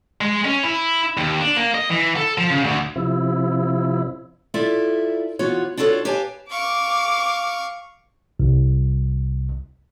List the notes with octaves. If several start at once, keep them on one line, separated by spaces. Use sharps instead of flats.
G#3
C#4
E4
D#2
D4
A#3
D#5
E3
A4
F3
C#3
D2
C3 F3 E4
E4 F4 A4 D5 E5
E3 B3 F4 F#4 C#5
D4 F4 F#4 A4 C5 C#5
G4 B4 C#5 F5 G#5 A5
F5 C#6 D6
C2